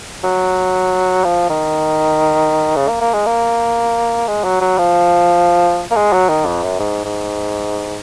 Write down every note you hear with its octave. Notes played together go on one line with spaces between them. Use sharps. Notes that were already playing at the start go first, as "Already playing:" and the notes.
F#3
F3
D#3
C#3
A#3
A#3
G#3
A#3
G#3
F#3
F#3
F3
A#3
G#3
F#3
D#3
F2
F#2
G#2
G#2